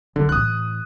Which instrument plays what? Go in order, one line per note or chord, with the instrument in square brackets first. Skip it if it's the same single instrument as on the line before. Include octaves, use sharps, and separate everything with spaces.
[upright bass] C2 [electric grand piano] D3
[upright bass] A2 E3 [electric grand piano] D#6 F#6